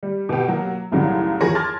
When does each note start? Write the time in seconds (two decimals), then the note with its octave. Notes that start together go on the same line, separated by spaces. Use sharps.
0.03 G3
0.29 B2 G4
0.48 F#3 A#3
0.92 B1 F#2 A2 C#3 F#3 G3
1.41 E2 F3 G#4 A#4 C#5 A#6
1.55 A5 C6 D6 F6 G#6 A6